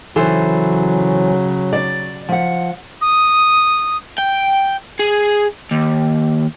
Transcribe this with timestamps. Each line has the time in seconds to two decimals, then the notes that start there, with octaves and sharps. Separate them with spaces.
0.16 C#3 E3 F#3 A4 C5
1.73 D5
2.29 F3 F#5
3.01 D#6
4.18 G5
4.99 G#4
5.71 D#2